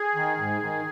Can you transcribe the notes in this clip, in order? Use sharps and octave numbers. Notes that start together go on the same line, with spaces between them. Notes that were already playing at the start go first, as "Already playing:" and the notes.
Already playing: G#4
D#3
G#2
D#3